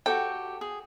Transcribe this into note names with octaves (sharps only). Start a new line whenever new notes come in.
F#4 G4 A4 G5
G#4